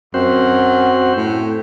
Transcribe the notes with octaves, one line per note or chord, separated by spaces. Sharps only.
F#2 C4 F#4 C5
A2